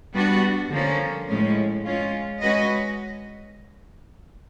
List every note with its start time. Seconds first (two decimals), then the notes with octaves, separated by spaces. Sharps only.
0.14 G3 B3 D4 F#4
0.71 D3 F3 A#3 C#4
1.28 A2 F3 G#3 C#4
1.84 G#3 C#4 F4
2.41 G#3 C#4 F#4 B4 D#5